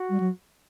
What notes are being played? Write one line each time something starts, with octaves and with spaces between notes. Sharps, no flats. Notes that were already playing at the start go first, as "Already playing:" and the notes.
Already playing: F#4
G3
F#3